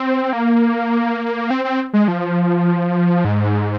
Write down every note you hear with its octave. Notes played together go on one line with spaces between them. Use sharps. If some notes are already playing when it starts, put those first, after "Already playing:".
Already playing: C4
A#3
C4
C4
G#3
F3
G#2